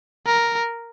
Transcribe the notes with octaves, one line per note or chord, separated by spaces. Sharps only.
A#4